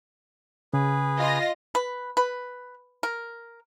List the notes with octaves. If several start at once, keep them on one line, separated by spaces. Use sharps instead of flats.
C#3 G#4 B4
F4 D#5 A#6
B4
B4
A#4